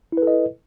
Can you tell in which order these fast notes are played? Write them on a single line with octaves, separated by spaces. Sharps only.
E4 B4 A4 D#5